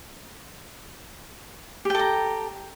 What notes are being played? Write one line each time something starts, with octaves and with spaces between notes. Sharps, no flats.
G4 A4 G5 A#5